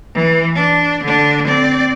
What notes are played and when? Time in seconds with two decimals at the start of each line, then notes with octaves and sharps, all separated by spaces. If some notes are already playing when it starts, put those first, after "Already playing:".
0.15 E3
0.55 D4
1.04 D3 D4
1.47 C4 D5